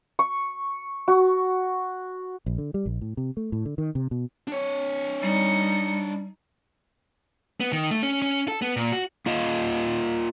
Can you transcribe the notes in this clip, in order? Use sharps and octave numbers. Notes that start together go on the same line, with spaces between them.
C#6
F#4
A#1
D3
G3
A#1
A2
C3
A3
A2
D3
D#3
C3
B2
D4 C#5
G3 D#4 C#7
B3
D#3
A3
C#4
C#4
A4
B3
A#2
F#4
A#3 F4 D#5 F5